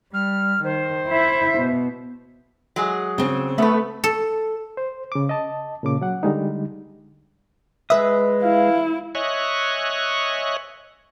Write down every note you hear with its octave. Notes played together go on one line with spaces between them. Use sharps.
G3 F6
D#3 C5
E4 E5
B2
F#3 G#3 G#4
C#3 C4
A3 B3 B4
A4
C5
C#3 D6
D#5 A5
A#2 C#3 D6
F#3 F#5
D3 G3 G#3 D#4
G#3 B4 E5 D#6
E4 F5
C#5 D#5 E5 G#5 C#6 F#6